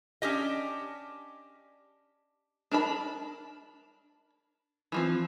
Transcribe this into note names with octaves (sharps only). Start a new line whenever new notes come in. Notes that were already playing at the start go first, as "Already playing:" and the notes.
C#4 D4 G4 D#5
D4 A#4 A5 B5
E3 F3 C4